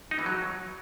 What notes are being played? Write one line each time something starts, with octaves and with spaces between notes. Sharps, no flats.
D#4
E3
F#3